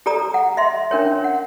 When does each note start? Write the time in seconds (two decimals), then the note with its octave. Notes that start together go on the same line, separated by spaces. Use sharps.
0.06 G4 A4 D5 A#5 D#6
0.34 F#5
0.57 D#5 E5 C6
0.91 C#4 D4 A#4 C#5
1.24 F#5